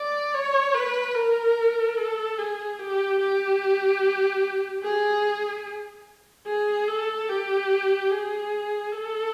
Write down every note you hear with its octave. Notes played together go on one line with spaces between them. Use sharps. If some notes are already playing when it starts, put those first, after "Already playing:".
Already playing: D5
C#5
B4
A#4
A4
G#4
G4
G4
G#4
G#4
A4
G4
G#4
A4